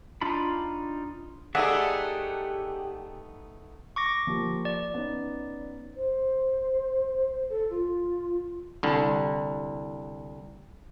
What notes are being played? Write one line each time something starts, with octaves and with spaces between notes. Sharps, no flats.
D4 D#4 F4 A5 B5
A3 B3 D#4 G4 G#4 D5 E5 F#5
C#6 D6 A#6
F3 A#3 G4
D5
B3 C#4 D#4
C5
A4
F4
C2 D3